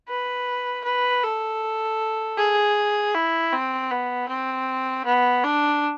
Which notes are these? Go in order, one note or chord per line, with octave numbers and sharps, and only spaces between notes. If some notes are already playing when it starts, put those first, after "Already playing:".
B4
B4
A4
G#4
E4
C4
B3
C4
B3
D4